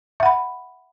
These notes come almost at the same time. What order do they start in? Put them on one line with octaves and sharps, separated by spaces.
E5 F#5 B5